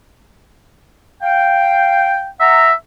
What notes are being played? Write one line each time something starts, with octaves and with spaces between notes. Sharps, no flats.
F5 G5
E5 F#5 A#5